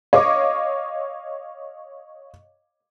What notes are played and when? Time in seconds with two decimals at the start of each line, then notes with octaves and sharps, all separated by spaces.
0.13 C#5 D#5 F5 C#6 D6